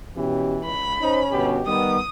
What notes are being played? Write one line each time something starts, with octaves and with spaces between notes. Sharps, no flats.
B2 E3 C#4 G4
C#2 B5
C#4 D#4 C5
G1 B2 G4
D#3 G3 B3 D#6